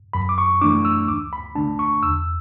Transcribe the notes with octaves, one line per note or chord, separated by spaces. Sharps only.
F#2 B5
D6
C#6
E3 A3 D4 D6
E6
D2 D6
B5
D3 A3 D4 A5
C#6
E2 E6